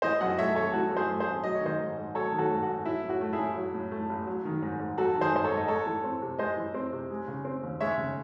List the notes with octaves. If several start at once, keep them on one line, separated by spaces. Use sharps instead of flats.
E3 C5 D#5
F#2 D#5 F#5
A3 C#5 E5
G#1 A4 C#5
E3 F#4
F#2
G#4 C5
A3
G#4 C5
G#1
F#3 D#5
C#5
D#3 C5 D#5
G#2
G#2
F#3 A4 C#5
D#3
F#4 A4
G#2
F#4
G#2
F#3 E4
A2
F#4
A3
E4 G#4
A1
F#3
A2
A3
A1
F#3
D#3
G#2
G#2
F#3 F#4 A4
D#3
G#4 C5
G#2 C5
A4 C#5
G#2
D#5
G#3 A4 C#5
E3
C4
C3
G#3 C5 D#5
E3
C4
C3
G#3
C#3
C4
D#2
G#3 C#5 E5
C#3